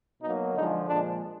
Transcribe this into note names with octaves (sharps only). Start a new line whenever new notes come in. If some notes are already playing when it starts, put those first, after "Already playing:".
B2 F#3 A#3 D#4
D3 F3 G#3 D#4
A#2 F3 G#3 D4